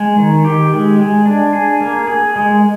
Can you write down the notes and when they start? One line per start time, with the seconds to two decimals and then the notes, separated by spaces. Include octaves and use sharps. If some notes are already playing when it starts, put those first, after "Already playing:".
Already playing: G#3
0.17 D#3
0.45 G4
0.72 G#3
0.99 G#3
1.26 D4
1.53 G#4
1.81 A#3
2.07 G#4
2.36 G#3